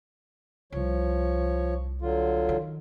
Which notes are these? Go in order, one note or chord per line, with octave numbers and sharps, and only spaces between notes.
C2 F3 C#5
D3 F#3 F4
D#3